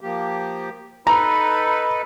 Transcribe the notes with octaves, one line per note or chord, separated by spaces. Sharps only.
F3 A#3 G4
D#4 A4 B4 A#5 B5